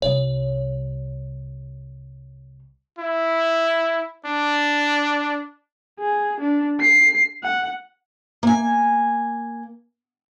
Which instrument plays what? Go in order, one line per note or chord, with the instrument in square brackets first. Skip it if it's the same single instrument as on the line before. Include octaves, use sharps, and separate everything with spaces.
[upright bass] C2 G3 [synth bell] C#5
[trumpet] E4
D4
[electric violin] G#4
D4
C7
F#5
[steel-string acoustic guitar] A#3 G#5